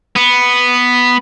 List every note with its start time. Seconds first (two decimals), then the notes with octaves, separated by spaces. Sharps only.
0.16 B3